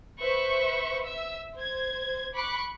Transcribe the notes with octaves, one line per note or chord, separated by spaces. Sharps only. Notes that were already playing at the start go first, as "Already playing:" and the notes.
B4 C5 E5 C#6
E5 E6
C5 G#6
B5 C#6 D6 F#6